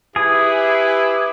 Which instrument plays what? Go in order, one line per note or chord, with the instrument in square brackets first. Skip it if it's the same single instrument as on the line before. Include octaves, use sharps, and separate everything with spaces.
[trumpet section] E4 G4 B4 [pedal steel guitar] G#4